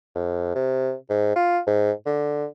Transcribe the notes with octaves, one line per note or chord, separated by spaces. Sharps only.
F2
C3
G#2
F4
G#2
D3